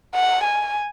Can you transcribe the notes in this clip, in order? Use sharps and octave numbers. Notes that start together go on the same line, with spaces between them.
F#5
G#5